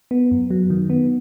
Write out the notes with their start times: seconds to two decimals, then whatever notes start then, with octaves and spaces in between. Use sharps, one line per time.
0.11 B3
0.31 F#2
0.50 F#3
0.70 D#3
0.90 B3